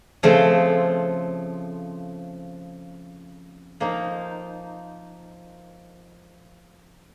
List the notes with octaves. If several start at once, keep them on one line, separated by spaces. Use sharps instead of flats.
C#3 F3 A3 C4
F3 A#3 D#4